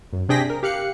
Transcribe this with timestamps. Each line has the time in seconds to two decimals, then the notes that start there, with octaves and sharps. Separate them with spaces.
0.13 F#2
0.29 C3 D4 G#4 G5 A#6 B6
0.50 A#4
0.63 G4 F5 F#6 C#7